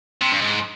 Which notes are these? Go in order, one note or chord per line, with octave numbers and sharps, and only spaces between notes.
C3
G2
G#2